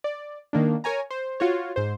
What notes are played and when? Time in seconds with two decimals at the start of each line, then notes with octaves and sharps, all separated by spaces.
0.04 D5
0.53 D#3 A#3 D4
0.84 A#4 C#5 G#5 A#5
1.11 C5
1.40 F4 F#4 C#5
1.76 G#2 C5